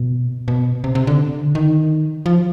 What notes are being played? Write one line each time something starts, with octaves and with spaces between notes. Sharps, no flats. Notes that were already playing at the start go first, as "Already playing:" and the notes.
Already playing: B2
B2
C3
C3
D3
D#3
F3